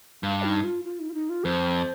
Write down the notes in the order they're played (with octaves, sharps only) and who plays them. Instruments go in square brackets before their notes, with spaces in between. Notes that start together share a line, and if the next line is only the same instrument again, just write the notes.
[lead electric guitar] G2 [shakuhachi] F5
[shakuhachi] D#4
F4
F4
D#4
F4
D#4
F4
[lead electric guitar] F2 [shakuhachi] C5